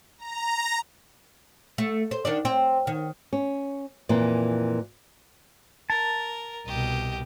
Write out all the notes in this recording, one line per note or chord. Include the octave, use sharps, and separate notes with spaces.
A#5
A3
C5
D#3 D4 D5
C4
D#3
C#4
F2 A#2 E3 A#3
A#4 A5
C2 B2 G4 D#5